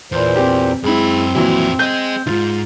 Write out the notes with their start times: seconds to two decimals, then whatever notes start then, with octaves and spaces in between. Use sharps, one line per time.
0.12 E2 A#2 E3 C5
0.36 C4 G4
0.84 F#2 G#3 C4 E4 B5
1.35 F2 A#2 E3 F#3 E4
1.79 G#4 D#5 G6
2.27 D2 G#2 F4